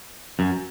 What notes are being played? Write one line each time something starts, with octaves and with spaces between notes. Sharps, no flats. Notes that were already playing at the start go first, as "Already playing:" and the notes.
F#2